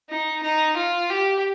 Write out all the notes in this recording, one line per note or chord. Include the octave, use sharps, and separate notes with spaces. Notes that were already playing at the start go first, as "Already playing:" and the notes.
D#4
D#4
F4
G4